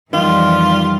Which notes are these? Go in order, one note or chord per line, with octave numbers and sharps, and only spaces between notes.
F2 D#3 E3 G3 F4